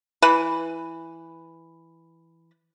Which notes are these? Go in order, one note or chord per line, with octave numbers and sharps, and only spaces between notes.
E3 B4 B5